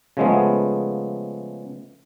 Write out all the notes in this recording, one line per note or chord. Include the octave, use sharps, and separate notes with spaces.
C#3 F3 G#3 A3 B3